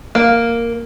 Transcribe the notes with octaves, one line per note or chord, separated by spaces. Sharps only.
A#3